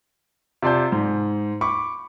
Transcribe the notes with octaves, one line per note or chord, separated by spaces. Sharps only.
C3 F4 D5 A5 G6
G#2
B5 C#6 D6